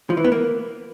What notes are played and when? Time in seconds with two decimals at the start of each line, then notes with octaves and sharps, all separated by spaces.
0.10 F3
0.17 E3
0.24 B3
0.32 A#3